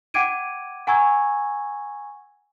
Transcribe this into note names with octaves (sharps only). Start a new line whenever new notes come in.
F#5 G5 D6 G#6 D7 D#7
F#5 G#5 A#5 C#6 E6 G#6